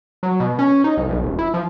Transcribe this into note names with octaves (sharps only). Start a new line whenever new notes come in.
F#3
B2
C#4
D#4
C2
B1
E1
E4
F3